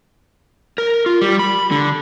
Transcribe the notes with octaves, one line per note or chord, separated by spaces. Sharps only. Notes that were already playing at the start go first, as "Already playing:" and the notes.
A#4
F4
G3
B5
D3